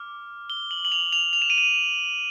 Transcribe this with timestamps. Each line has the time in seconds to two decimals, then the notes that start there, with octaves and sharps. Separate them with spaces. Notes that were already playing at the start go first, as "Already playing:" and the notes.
Already playing: D6 F6
0.50 G7
0.71 F#7
0.85 F#7
0.92 F7
1.13 F7
1.33 F7
1.42 E7
1.50 D#7
1.58 E7